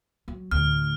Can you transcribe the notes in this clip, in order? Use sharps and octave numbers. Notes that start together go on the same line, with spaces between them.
F#3
D2 A2 F6